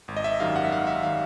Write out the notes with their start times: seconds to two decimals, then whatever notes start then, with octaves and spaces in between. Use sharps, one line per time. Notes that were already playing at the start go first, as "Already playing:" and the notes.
0.08 G#1
0.16 D#5
0.24 E5
0.40 F#2 D#3 G3 F5
0.56 F#5
0.65 E5
0.72 G#1 F5
0.87 E5
1.03 D#3 G3 F5